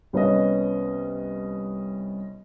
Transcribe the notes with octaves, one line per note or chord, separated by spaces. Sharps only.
C2 B3 C#4 D#5